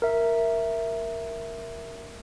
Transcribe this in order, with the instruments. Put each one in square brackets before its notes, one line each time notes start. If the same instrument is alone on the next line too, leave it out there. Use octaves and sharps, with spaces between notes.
[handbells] A#4 E5